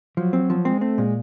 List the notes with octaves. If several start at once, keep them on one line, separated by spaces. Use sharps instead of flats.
F3 F#3
C4
F3
G#3 C4
A3 C4
A#2 G#3